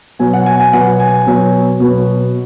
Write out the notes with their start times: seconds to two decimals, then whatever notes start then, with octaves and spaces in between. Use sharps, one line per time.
0.19 B2 F#3 B3 G#5
0.33 F#5
0.46 G#5
0.60 G#5
0.73 B2 F#3 B3 F#5
1.00 G#5
1.27 B2 F#3 B3
1.80 B2 F#3 B3